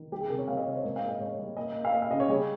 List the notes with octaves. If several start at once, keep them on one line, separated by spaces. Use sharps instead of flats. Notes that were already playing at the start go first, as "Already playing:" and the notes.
Already playing: D#3
G3 G4
G#4
C3 A#4
C#5
G3 F5
D#5
C3 C#5
C5
G#2 A#4
F5
A#3
D#5
G#2 C#5
G3
A#3 D#5
A#3
F5
A#3 D#5
F5
C#3 D#5
C#5
G3 G#4